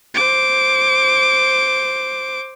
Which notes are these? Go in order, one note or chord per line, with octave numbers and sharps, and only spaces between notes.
C5 D6